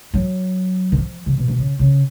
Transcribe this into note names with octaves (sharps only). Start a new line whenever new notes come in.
F#3
D#3
F3
C#3
B2
D#3
C#3
C#3